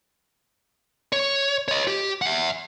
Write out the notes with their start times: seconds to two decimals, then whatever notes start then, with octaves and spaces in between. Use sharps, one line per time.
1.13 C#5
1.68 C#5 D#5
1.88 G4
2.22 E5 F#5